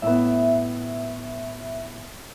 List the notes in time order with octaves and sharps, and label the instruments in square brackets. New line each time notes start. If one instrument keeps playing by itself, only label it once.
[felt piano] A2 B3 [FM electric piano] E5